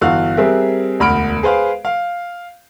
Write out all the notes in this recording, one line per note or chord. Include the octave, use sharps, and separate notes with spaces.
G1 E3 F#4 F5 E6 F#6
G3 C4 G#4 A#4 E5
E1 D2 B5 F6 D7
G#4 B4 C5 F5
F5